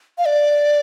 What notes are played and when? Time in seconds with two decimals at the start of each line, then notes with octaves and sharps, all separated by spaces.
0.18 F5
0.26 D5